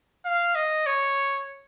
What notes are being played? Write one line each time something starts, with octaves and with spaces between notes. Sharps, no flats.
F5
D#5
C#5